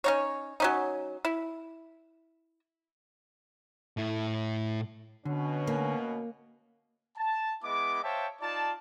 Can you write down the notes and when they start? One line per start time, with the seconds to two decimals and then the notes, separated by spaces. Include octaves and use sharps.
0.04 C#4 D#4 C#5
0.60 F#3 C#4 D#4
1.25 E4
3.97 A2 E4
5.25 B2 D3 C#4
5.67 A#3
7.18 A5
7.64 G#3 B3 E4 D#5 D6
8.03 C5 C#5 E5 F5 G5 A5
8.42 D#4 F4 D5 A5